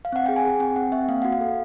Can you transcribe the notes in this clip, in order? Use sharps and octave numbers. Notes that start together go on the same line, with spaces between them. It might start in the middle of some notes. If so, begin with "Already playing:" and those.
F5
C4 F#5
G#4 G5
G#5
G#4
C4 G5
C4 F#5
C4 E5
A#3 F5
F#4 F#5
F5
A4